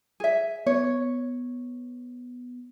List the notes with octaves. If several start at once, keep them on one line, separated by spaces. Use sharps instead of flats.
G#4 E5
B3 C#5